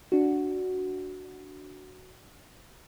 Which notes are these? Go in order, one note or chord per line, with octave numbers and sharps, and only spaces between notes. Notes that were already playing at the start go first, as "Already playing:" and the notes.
D4 F#4